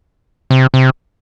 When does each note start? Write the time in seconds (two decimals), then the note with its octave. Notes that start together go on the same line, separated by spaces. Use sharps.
0.51 C3
0.74 C3